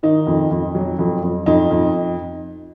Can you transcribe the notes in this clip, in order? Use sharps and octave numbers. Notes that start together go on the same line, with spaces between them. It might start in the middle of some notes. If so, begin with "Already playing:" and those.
D#3 D#4
F2
F2
F#3
F2
F2
F2 D#4
F2